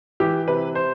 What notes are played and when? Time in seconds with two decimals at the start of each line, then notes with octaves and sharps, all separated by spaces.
0.20 E3 G4
0.48 C3 B4
0.75 C5